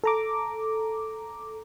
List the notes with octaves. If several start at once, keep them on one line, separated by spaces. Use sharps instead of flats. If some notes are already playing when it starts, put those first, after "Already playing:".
A4 A#5 D6